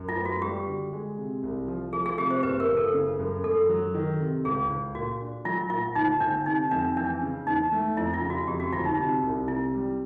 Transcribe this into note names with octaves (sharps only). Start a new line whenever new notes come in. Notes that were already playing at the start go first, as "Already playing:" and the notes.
Already playing: F#2
F4
B3
F#4
G3 G4
D3
G#3
C3
C2
F3
F3 G#4
G#4
C3 G4
C5
F#1 B4
A#4
F#1
A4
C#3
F#2
F#2 A4
F#3
D#3
C3
C#2 G#4
C#2
A#2 F#4
D4
F#3 F4
A#2 F4
G1 D#4
G1 D4
C3 D#4
F2 D4
E3 D4
C#3
E2 D#4
A3
F2 E4
F4
C#3
F#4
F2 G4
F#4
G1 F4
D#4
C3 D#4
C2
C3 E4
G3